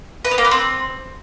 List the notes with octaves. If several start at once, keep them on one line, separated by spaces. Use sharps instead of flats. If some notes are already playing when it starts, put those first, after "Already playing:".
B4
B3
A#3
B3
C4